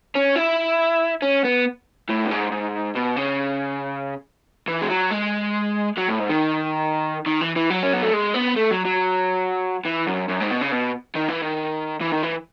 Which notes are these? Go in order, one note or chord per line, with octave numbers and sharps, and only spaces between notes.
C#4
E4
C#4
B3
A2
F#2
G#2
G#2
B2
C#3
E3
G#3
F#3
G#3
F#3
A2
G#2
D#3
D#3
E3
E3
F#3
C#4
B3
A3
G#3
B3
A3
F#3
F#3
E3
F#2
F#2
G#2
B2
C#3
B2
D#3
E3
D#3
E3
D#3
E3